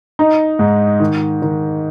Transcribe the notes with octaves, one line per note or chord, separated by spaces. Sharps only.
D#4
G#2
D#3
D#3